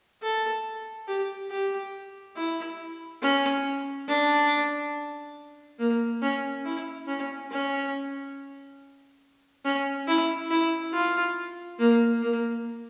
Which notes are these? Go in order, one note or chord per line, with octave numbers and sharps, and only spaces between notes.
A4
G4
G4
E4
C#4
D4
A#3
C#4
E4
C#4
C#4
C#4
E4
E4
F4
A#3
A#3